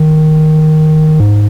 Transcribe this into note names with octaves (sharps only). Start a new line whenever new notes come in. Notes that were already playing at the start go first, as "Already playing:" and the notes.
Already playing: D#3
G#2